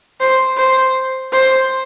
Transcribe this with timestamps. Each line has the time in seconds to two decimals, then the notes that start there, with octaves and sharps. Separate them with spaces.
0.20 C5
0.57 C5
1.32 C5